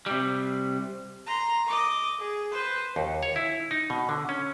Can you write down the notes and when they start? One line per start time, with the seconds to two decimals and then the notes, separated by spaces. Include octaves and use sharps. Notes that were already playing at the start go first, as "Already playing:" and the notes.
0.06 C3 G3
1.27 A#5 C6
1.67 D#5 D6
2.20 G#4
2.51 B4 C5
2.96 D#2
3.23 C#5
3.36 E4
3.71 D#4
3.90 B2
4.09 D3
4.29 C#4